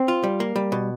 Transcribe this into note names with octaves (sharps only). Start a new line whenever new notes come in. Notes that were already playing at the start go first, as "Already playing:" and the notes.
Already playing: C4
F4
G3
A#3
G3
B2